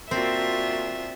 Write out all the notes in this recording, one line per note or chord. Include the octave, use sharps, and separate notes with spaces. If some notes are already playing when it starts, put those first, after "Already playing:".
A#3 C4 D4 F4 F#4 E5